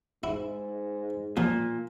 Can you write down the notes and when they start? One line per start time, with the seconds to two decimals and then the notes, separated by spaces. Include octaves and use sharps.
0.24 G#2 E4
1.37 A#2 F3